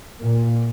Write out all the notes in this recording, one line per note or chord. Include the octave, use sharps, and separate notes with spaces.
A#2